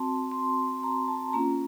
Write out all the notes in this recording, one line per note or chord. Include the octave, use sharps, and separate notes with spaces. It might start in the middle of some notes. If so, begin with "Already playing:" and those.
Already playing: C4 F#4 A5 C6
C6
A#5
A5
A#3 C#4 F4 A#5